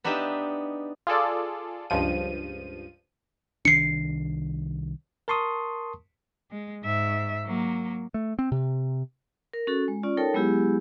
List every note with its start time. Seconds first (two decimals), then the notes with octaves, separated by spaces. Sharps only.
0.04 B3 D4 D#4 G4 E5
1.07 F4 G#4 A4 D5
1.90 C#2 G2 F3 D#7
3.65 C2 D#3 D4 C7 C#7
5.28 A#4 A5 C6 C#6 D#6
6.51 G#3
6.83 G#2 E5
7.45 F#3 A#3
8.14 A3
8.39 C4
8.52 C3
9.53 A#4
9.67 C#4 F#4 A4
9.88 G#3
10.03 C#4 F4 D5
10.17 D#4 A4 A#4 C#5 G5 A5
10.34 F#3 G#3 B3 E4 G4 G#4